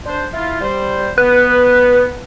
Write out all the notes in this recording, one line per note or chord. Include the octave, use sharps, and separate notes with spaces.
D4 C5
E4 F4
G3 C5
B3 B4